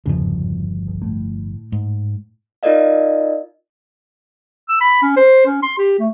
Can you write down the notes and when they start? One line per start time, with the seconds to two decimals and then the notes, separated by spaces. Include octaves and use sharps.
0.06 G1 E2 G#2 C#3 F3
0.88 B1
1.02 A2
1.72 G#2
2.63 D#4 F4 A#4 D5 D#5 F5
4.69 E6
4.81 B5
5.02 C#4
5.17 C5
5.46 C#4
5.63 C6
5.78 G4
5.99 A3